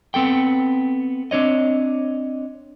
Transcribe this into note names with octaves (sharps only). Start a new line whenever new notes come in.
B3 C4 A4 G5
C4 D4 C#5 D#5